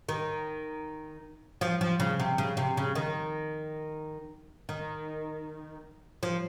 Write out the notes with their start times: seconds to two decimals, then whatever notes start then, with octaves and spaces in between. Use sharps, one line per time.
0.09 D#3
1.61 F3
1.81 F3
2.00 C#3
2.20 C3
2.38 C#3
2.57 C3
2.77 C#3
2.95 D#3
4.69 D#3
6.23 F3